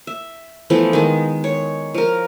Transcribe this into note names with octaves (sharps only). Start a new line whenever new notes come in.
E5
E3 F3 A3 B3
D#3 G#3
C#5
F3 A#4